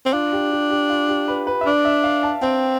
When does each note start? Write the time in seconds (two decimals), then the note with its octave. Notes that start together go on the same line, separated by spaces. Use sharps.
0.06 C4
0.13 D4 F4
0.33 G4
0.52 G4
0.70 G4
0.90 F4
1.09 G4
1.28 B4
1.47 B4
1.61 E5
1.65 D4 D5
1.85 E5
2.04 F5
2.23 A5
2.42 C4 G5